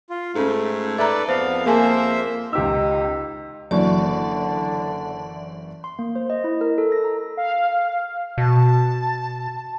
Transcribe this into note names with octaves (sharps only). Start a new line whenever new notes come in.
F4
G#2 A3 C#4 A4
A4 B4 D5 E5 A#5
F2 B3 C5 F5
A#3 G#4 C5 E5 G#5 A5
C#2 D#4 G4 E6
F#1 D3 E3 F#3 D5 C#6
C6
A#3
C5
D#5
E4
A#4
A4
A#6
A#5
F5
B2 A5